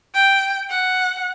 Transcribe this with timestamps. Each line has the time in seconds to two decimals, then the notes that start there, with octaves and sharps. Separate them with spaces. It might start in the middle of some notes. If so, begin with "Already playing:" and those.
0.15 G5
0.70 F#5